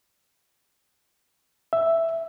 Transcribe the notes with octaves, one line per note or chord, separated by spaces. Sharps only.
E5